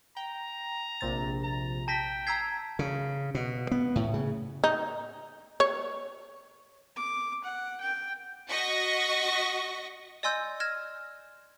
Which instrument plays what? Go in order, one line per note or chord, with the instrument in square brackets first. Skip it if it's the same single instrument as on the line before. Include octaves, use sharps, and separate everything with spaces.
[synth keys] G5 [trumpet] A#5
[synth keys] A#1 C3 A6
[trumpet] A#5
[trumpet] G5 [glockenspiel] A5 A#6 B6
[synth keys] A#5 E6 C7 [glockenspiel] G#6 B6
[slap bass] C#3
B2
B3
A2
C#3
[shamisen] D#4
C#5
[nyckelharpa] D6
F#5
G5
[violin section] F#4 D#5 C#6 A#6 B6
[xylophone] D5 D#5 G#5 C6 E6 G6
F6 G#6 A#6 E7